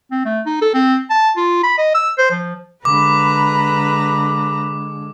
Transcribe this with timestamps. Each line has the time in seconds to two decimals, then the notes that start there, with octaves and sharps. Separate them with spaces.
0.11 C4
0.25 A3
0.46 D#4
0.62 A4
0.74 C4
1.10 A5
1.37 F4
1.63 B5
1.78 D#5
1.95 E6
2.18 C5
2.31 F3
2.85 D3 G#3 B4 A#5 B5 D6